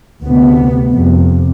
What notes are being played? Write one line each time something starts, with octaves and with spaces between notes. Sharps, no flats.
D2 C3 B3
F2 C3